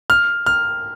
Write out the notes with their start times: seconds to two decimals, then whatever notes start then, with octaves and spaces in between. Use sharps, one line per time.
0.10 F6
0.46 F6